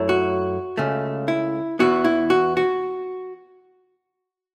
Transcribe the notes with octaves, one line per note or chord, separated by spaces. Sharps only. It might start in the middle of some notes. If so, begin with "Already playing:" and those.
Already playing: F#2 F#3 A3 E4
F#4
C#2 C#3 A3
E4
E2 E3 B3 E4 F#4
E4
F#4
F#4